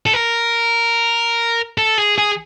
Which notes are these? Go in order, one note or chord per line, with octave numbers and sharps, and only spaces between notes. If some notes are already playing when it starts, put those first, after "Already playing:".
A4
A#4
A4
G#4
G#4